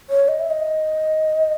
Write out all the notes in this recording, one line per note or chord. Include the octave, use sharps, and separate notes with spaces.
C#5
D#5
E5
D#5